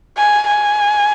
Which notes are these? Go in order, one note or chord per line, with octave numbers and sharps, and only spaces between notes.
G#5
G#5